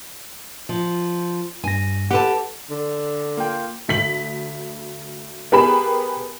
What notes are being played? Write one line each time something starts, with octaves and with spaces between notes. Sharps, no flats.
F3
G2 G#5 A#6
G4 A4 B4 F#5 A5
D3
A#3 F4 G5
D2 B6 F#7
B3 G4 G#4 A#4 B5 E7